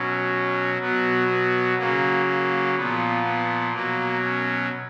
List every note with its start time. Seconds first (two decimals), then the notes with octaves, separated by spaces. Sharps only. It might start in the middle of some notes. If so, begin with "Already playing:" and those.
Already playing: B2 F#3 C#4
0.80 B2 F#3 B3
1.29 B3
1.78 C#3 F#3 A#3
2.27 A#3
2.76 A#2 F3 B3
3.25 B3
3.73 B2 F#3 A#3
4.22 C#4